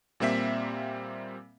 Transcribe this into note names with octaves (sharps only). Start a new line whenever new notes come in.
A#2 G3 A#3 C4 E5 B6